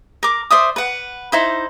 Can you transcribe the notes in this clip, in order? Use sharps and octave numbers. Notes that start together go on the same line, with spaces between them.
A#4 D6
C5 D5 E5 D#6
B4 F#5
D#4 E4 C5